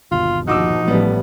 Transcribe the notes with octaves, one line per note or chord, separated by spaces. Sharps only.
G1 D#2 B2 F4
A#1 F3 D#4 F#4 D6 E6
A1 A2 G3 G#3 B3